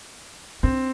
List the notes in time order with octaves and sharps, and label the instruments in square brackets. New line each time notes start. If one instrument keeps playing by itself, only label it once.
[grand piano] C4 [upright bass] D4